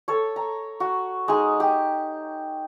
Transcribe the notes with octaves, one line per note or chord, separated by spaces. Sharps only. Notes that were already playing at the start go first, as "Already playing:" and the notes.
A4 C#5
A#5
F#4
G#3 D#4 G#4
G4